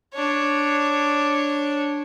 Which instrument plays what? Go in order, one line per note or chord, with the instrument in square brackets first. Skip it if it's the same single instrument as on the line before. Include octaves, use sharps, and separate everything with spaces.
[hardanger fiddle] D4 C#5